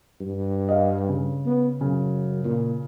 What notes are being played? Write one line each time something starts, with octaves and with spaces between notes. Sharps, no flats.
G2
D#5 F5
C#3
B3
F#2 C#3
A#2